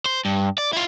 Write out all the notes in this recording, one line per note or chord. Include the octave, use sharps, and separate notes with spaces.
C5
G2
D5
E4 F4